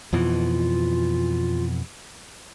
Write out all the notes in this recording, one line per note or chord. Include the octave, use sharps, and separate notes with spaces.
F2 B2 E3 F4